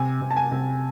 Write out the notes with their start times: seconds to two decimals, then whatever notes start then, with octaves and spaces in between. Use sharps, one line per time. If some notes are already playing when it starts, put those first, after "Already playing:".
Already playing: C3 G#5
0.21 C3
0.31 A5
0.36 G#5
0.51 C3